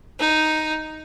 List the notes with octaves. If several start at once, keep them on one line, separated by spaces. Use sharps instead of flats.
D#4